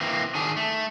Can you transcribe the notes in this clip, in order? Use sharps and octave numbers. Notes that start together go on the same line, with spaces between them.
E3 A#3 C4
D#3 D4 G#4
A3